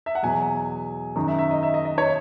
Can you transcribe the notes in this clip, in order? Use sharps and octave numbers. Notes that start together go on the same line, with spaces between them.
E5
F#5
E2 B2 F#3 G#5
F#2 D#3 F#3
E5
E5
D#5
E5
D#5
D#5
C#5